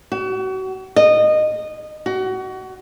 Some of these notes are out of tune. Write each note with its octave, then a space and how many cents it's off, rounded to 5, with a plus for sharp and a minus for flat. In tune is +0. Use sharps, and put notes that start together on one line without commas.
F#4 +35
D#5 -20
F#4 +25